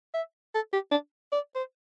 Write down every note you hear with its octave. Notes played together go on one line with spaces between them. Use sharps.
E5
A4
G4
D4
D5
C5